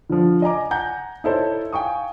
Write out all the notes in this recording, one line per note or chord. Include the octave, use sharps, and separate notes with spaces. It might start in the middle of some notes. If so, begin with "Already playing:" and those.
D3 F3
D#5 G#5 A#5 D6
F#5 G#5 A#5 G6
D#4 E4 A4 C5 C#5
F5 G5 G#5 C#6 D#6